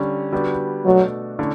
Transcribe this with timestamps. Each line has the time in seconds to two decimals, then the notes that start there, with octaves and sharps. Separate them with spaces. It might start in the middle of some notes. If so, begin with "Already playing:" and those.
Already playing: D3 G3 C#4
0.32 D3 G3 B3 D4 F#4
0.85 B2 F#3 A3 D4 F#4 A4
1.39 D3 A3 C#4 E4